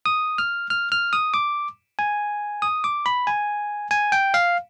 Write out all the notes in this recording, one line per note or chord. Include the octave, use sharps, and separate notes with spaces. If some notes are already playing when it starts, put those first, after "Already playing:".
D#6
F6
F6
F6
D#6
D6
G#5
D#6
D6
B5
G#5
G#5
G5
F5